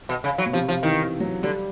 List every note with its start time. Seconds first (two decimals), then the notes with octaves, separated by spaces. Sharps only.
0.09 B2
0.24 C#3
0.38 F#3
0.46 B2
0.53 C3 F3
0.68 C3 F3
0.83 D#3 E3
1.20 F#3
1.42 D3 G3